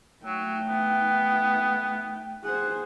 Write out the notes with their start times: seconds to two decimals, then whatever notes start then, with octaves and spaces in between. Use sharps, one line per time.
0.25 F#3 A3 G5
0.69 B3
2.44 G#4 C5 F#5